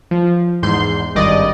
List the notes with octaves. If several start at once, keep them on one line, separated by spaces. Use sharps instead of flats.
F3
E2 G#2 C6 G6
G#1 G2 D5 D#5